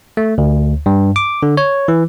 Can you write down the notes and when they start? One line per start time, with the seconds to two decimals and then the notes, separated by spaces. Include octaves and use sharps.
0.17 A3
0.38 D2
0.86 G2
1.16 D6
1.43 D3
1.57 C#5
1.88 E3